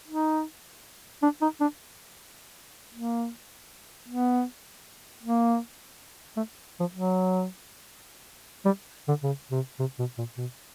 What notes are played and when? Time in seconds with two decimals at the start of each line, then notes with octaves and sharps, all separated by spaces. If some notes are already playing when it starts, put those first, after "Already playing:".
0.08 D#4
1.22 D4
1.42 D#4
1.61 D4
2.94 A#3
4.08 B3
5.23 A#3
6.37 A3
6.80 F3
6.94 F#3
8.66 G3
9.08 D3
9.23 C#3
9.51 C3
9.79 C3
9.99 B2
10.18 A#2
10.37 B2